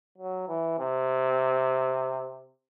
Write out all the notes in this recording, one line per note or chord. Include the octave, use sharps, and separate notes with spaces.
F#3
E3
C3